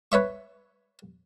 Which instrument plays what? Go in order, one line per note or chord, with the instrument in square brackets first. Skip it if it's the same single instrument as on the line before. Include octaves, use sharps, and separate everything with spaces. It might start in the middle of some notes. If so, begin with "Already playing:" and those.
[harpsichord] B4 C#5 E5 C#6